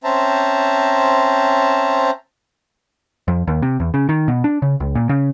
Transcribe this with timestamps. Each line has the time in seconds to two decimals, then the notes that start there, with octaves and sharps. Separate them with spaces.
0.04 C4 C#4 C5 E5 A5 A#5
3.28 F2
3.47 D#2
3.62 C3
3.80 E2
3.94 C#3
4.09 D#3
4.28 B2
4.44 D4
4.62 C#3
4.80 C#2
4.95 A#2
5.09 C#3